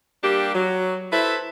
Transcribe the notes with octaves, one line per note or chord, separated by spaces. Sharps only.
G3 A#3 D4 G4
F#3
E4 A4 B4 C5 E5